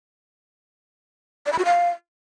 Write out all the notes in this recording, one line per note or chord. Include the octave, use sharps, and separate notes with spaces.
D5
B5
F#4
F5